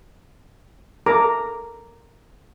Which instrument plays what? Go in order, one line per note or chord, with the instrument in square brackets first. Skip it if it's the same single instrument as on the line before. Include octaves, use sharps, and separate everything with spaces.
[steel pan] A4 A#4 A#5 D6